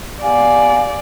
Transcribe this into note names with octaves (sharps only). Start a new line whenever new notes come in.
B3 G4 D5 F5 G#5